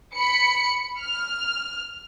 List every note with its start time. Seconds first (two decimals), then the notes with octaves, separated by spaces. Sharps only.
0.16 B5 C#7
1.01 F6